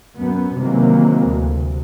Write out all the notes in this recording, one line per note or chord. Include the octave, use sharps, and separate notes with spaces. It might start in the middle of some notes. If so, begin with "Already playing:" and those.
F#2 B3
C3 D#3 E3 F#3 G#3 A#3
D2 C3